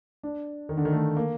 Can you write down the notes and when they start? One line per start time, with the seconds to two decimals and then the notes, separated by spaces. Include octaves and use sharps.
0.23 D4
0.69 D#3
0.77 D3
0.85 D#3
0.93 A3
1.17 A#3